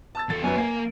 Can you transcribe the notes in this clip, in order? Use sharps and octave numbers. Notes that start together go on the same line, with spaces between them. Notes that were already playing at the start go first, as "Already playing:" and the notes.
A5 E6 A6
E2 A4 A6
F#2 F#3 B3 B4 G#5
A#3 A#4 G#5